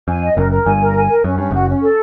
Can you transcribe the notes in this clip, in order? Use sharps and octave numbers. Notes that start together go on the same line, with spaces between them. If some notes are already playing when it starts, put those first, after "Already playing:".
F2 G#5
D#5
F#1 F#2 A#4
A#4
G1 G2 G#5
A#4
G#5
A#4
F#2 C#4
G2 C#4
F#1 F#2 F#4
C#4
A4